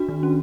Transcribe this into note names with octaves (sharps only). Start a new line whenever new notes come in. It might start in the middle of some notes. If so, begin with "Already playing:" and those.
Already playing: D4 F#4
D#3
C#4